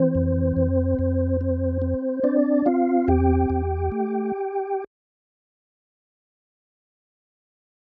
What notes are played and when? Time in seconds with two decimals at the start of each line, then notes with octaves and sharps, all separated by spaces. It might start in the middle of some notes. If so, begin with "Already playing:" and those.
Already playing: E3 C4 C5
0.15 F2
0.56 F2
0.99 F2
1.41 C4
1.82 C4
2.24 C4 D4 D5
2.66 C4 F4 F5
3.08 E2 G4 G5
3.50 E2
3.92 A3